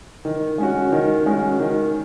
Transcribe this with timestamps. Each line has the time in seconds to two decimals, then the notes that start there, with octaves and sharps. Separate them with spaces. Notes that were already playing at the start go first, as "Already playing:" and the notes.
0.25 D#3
0.58 G#3 C#4 F#4
0.92 D#3
1.26 G#3 C#4 F#4
1.60 D#3